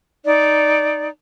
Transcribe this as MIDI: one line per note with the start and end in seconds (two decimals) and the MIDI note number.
0.24 1.07 63
0.24 1.07 74